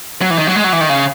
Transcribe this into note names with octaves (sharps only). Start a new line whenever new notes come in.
F#3
E3
D#3
F#3
G#3
F#3
E3
D#3
C#3